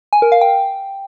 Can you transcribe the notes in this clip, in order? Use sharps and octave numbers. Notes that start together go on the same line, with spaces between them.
G#5
A#4
F5
G5